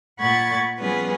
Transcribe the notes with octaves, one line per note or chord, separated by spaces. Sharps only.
A#2 F#5 B5 C#6 G#6 A6
F3 G3 B3 C#4 G#4 B4